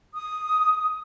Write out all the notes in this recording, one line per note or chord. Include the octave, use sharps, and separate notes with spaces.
D#6